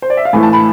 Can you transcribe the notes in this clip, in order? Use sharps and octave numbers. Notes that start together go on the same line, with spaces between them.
C5
D5
E5
F5
A2 E3 A3 G#5
A5
B5